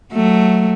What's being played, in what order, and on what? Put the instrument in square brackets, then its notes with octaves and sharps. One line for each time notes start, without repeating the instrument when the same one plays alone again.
[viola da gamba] F#3 A3